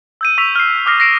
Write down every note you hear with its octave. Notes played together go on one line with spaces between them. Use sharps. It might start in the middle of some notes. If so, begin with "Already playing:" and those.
E6 G6 D#7
C#6 E6 B6 D#7 F7
F6 C7
D6 D#6 F6 A#6 C7
A#6 C7 D7 E7